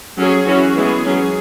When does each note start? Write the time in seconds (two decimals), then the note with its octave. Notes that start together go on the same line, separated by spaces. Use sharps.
0.18 F#3 C#4 G#4
0.47 E3 C#4 F#4
0.76 E3 G#3 B3 G#4
1.04 F#3 C#4